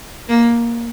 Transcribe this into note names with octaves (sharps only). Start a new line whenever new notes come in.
A#3